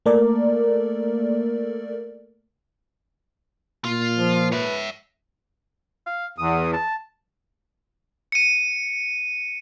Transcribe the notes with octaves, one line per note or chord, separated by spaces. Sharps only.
A3 A#3 A4 A#4 D5
A#2 F4
F3
B4 C#5 E5
F5
E2 D#6
A5
C#7 D#7